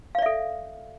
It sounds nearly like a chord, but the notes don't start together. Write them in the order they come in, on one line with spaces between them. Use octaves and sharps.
F5 D5 E5 A4